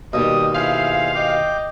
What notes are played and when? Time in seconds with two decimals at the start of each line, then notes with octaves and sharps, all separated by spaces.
0.13 D#2 B2 G3 D#5 D#6
0.54 E4 G#4 C5 D#5 F5
1.15 D#5 G5 D6